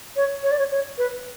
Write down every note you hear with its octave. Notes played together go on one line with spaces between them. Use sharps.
C#5
C#5
D5
C#5
C#5
B4